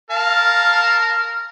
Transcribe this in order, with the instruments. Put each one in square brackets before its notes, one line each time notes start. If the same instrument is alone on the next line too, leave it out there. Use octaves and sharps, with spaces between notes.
[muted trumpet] A#4 [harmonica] F5 A5